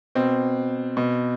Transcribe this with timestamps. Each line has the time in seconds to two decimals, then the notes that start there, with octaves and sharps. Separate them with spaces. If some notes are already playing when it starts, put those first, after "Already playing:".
0.15 B2 C4
0.97 B2